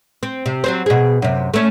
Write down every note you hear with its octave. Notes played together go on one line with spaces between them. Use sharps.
C4
C3
F#3 C4 C5
B2 G#4
F#2 C3
A3 C#4